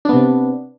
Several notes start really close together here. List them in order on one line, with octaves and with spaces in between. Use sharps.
D4 B3 C3